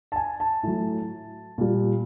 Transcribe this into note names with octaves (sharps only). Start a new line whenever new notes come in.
A5
G#5
A5
A2 F#3
A#2 G3